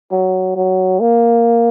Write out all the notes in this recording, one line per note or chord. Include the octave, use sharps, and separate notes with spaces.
F#3
F#3
A#3